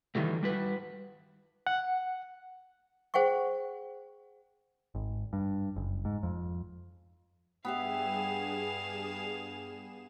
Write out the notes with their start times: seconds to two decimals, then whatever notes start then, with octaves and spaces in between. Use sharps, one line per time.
0.15 D#3 E3 F#3 G3 A3
0.43 G3 F#4 B4
1.67 F#5
3.14 G#4 C5 F#5 G5 C#6
4.95 G#1
5.33 G2
5.76 F#1
6.05 G#2
6.23 F2
7.65 G2 B3 G4 G#4 E5 F5 E7